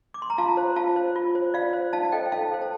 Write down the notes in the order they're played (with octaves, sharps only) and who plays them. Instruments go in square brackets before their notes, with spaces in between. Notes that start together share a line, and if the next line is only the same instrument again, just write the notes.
[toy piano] D6
C6
A#5
F4 F5 A5
C5
F4 F5 A5
C5
F4
C5
F4 D5 F5
C5
D#4 F5 A5
F5
A4 C5 D#5 G5
G5
D#4 F5 A5
A4 C5
A5